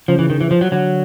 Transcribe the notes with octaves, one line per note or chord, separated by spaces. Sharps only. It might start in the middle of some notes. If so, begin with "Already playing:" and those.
C#3 F3
E3
D#3
E3
F3
F#3
D3 F#3